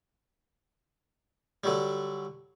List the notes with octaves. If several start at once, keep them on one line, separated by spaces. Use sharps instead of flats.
D3 F#3 G3